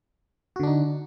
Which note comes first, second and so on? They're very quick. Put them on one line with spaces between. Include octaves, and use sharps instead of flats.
F#4 D3 D4 D#4